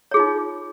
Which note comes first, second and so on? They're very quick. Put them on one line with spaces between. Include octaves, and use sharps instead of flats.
C#5 G#4 F4 D#4